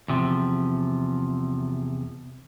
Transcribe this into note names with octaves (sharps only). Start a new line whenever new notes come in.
E2 C3 F3